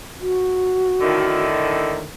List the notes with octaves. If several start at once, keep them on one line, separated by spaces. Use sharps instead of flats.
F#4
A2 D3 D#3